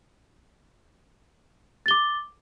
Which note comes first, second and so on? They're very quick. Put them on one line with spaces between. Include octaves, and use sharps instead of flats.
A6 G7 D6